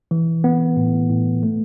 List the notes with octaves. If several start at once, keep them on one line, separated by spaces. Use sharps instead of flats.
E3
B3
A2
A2
A3